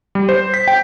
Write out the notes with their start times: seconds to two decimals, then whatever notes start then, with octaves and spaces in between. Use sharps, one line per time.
0.15 G3
0.29 C5
0.54 B6
0.68 G5